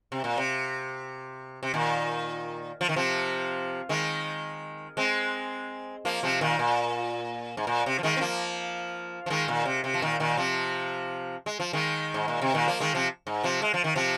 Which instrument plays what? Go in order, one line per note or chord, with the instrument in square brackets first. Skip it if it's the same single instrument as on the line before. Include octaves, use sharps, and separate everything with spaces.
[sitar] C3
A#2
C3
C3
A#2 D#3
F3
D#3
C3 F3
D#3 G#3
G#3 C4
F3 A#3
C3 F3
A#2 D#3
A#2
G#2
A#2
C3
F3
D#3 G#3
C4
F3 A#3
F3
D#3 G#3
A#2 D#3
C3
C3
F3
A#2 D#3
A#2 D#3
C3 F3
G#3
F3
D#3 G#3
G#2
A#2
C3
A#2 D#3
F3 A#3
D#3 G#3
C3 F3
G#2
C3 F3
G#3
F3
D#3
C3 F3